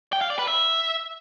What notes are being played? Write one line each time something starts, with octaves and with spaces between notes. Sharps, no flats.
G5
F5
D5
B4
E5